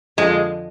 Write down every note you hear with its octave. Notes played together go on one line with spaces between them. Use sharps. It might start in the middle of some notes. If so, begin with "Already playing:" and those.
F2 D3 F3 G#3